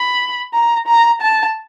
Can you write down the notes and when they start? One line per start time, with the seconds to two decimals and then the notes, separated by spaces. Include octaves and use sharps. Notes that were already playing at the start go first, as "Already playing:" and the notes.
Already playing: B5
0.54 A#5
0.88 A#5
1.21 A5